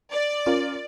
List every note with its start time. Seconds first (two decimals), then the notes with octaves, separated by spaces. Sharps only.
0.12 D5
0.46 C#4 F4 A#4